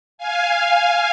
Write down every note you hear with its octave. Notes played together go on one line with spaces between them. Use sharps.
F5 G#5